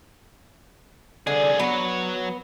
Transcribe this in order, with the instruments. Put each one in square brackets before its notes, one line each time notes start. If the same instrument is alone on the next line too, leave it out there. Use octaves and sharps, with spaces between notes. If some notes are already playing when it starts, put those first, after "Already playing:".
[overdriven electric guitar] C2 G#4 [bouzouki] D3
[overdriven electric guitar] F#3 C#5 [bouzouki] B3